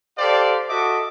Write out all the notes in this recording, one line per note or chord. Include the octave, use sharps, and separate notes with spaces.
G4 A4 C5 D5 F5
F#4 A4 D#5 E5 D6